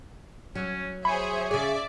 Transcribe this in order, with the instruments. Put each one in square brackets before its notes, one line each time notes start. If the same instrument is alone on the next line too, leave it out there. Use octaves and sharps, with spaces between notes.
[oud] F#3 [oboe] C#4
[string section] G#4 C5 E5 [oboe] C#5 [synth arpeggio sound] B5
[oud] C#3 G#4 [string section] D5 E5